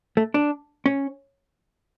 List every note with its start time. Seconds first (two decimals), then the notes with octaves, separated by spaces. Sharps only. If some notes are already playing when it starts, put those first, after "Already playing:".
0.17 A3
0.34 D4
0.86 C#4